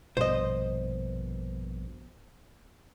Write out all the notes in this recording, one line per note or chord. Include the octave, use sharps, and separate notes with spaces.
A#1 G2 B2 C5 D#5